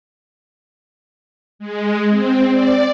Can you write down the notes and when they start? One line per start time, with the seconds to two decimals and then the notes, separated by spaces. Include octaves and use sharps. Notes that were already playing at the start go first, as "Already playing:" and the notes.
1.59 G#3
2.10 C4
2.51 D5